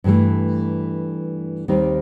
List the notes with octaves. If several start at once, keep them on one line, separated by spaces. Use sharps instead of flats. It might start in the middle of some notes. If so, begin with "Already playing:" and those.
G2 E3 A3
D#2 D#3 G3 C4 D#4